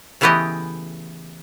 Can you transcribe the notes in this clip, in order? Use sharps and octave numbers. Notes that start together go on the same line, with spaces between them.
C#3 E3 A3 B3 G4 D#5